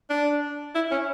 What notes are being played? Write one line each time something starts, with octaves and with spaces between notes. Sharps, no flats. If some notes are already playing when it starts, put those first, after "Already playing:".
D4
E4
C#4